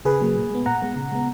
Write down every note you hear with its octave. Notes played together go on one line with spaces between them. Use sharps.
C#3 G#4 B4
F#3 A#3
A#2
G#3 B3
A#2 F#5 A#5
G#3 B3
C#3
G#3 B3